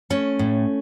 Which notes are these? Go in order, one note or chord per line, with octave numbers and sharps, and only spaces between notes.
A3 C#4
A2